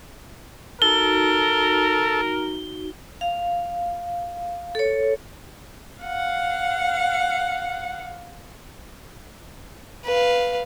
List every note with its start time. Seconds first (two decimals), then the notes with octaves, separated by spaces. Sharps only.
0.82 D#4 F#4 A4 A#4 G7
3.21 F5
4.75 A4 C#5
6.04 F5 F#5
10.05 B4 F5